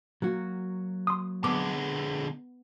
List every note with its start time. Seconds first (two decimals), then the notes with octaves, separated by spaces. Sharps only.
0.22 F#3 A#3 F#4
1.07 C6 D#6
1.44 D3 G#3 B3 D6